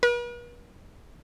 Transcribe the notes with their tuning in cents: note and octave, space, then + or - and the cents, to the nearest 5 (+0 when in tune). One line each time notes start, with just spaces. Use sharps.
B4 -45